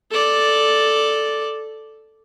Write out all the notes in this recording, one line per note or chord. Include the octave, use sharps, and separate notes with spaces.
A4 D5